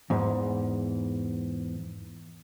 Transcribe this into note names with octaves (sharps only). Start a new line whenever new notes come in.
E2 G#2